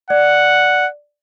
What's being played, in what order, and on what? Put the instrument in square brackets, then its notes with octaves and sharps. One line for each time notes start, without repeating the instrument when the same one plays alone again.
[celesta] D5 [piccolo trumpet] F#5